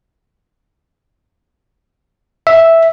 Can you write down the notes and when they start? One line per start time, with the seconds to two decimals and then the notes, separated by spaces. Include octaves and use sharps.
2.47 E5